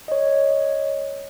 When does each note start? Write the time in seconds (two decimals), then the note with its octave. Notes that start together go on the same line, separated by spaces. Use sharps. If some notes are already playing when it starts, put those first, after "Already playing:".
0.08 C#5 D#5